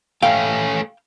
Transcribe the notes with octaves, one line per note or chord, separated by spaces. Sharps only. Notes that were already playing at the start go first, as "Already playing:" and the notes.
A3 C#4 F5 G5